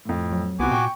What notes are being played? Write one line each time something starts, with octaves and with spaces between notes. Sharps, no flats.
F2 A2
F#3
C2 C3 B3 F#4 G#5 D6
A#2 G5 C#6